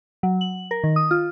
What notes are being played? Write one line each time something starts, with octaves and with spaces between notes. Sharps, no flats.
F#3
F#7
A#4
D#3
D#6
F4